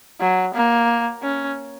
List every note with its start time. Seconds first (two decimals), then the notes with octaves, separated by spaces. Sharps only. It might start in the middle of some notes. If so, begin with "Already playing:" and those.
0.21 F#3
0.55 A#3
1.23 C#4